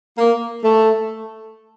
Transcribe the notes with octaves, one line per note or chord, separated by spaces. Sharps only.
A#3
A3